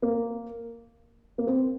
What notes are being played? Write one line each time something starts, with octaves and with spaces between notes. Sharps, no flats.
A#3
A#3
C4